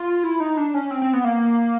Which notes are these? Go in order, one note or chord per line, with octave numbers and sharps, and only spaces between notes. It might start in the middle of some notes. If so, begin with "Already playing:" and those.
Already playing: F4
E4
D#4
D4
C#4
C4
C4
B3
A#3